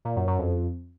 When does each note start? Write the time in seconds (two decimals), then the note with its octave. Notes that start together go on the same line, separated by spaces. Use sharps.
0.05 A#2
0.16 F#2
0.28 F#2
0.39 F2